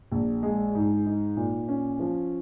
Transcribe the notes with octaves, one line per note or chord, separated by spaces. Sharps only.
A#1
G#3
G#2
D#4
A#2
C#4
F3